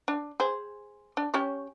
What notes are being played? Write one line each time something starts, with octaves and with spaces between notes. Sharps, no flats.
D4
G#4 C5
D4
C#4 G4 C#5